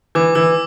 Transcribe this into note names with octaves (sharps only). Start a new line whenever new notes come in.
E3 D6
E3 E6